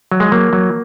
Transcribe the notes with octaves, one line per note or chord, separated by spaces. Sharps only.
F#3
G#3
F#3 A#3
F#3